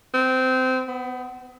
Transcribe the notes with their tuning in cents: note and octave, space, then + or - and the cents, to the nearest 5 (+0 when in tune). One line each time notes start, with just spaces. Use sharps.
C4 -20
B3 +25